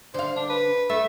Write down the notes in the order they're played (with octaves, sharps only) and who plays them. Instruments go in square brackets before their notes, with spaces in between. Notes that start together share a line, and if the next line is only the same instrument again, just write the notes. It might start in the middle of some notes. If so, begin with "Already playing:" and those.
[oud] D3 F5 [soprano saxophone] C5
[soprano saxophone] D4
B4
[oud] A3 [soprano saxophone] E5